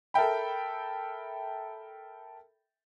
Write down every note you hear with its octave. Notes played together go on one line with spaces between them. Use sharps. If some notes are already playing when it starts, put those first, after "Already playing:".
A4 A#4 E5 G5 B5